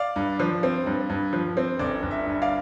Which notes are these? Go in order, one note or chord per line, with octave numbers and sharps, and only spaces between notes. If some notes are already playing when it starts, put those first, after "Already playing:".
Already playing: D5 F5
G2
F3
C4
G2
G2
F3
C4
G1 D5
G1
E5
G2
D5 F5